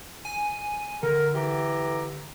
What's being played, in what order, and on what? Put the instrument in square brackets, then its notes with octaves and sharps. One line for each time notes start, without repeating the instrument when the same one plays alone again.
[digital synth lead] G#5
[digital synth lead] D3 [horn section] A#4
[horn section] E3 G4 A#5